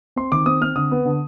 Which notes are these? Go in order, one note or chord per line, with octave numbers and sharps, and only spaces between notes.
C4 C6
D#3 D6
C4 D#6
C4 F6
D3 D#6
B3
D3